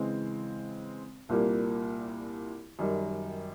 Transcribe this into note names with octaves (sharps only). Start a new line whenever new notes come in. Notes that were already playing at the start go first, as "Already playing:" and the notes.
Already playing: C#3 E3 G#3 C4
C2 A#2 G3 A#3
F#2 D#3 G3